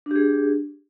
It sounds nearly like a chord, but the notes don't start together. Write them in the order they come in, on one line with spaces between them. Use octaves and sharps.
D4 G4 G#4